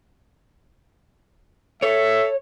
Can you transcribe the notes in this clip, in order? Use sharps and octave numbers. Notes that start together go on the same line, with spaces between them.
A4 C#5 E5